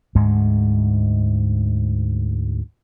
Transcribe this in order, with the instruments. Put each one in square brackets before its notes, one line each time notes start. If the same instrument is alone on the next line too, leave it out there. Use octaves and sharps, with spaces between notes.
[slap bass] D2 G#2 G#3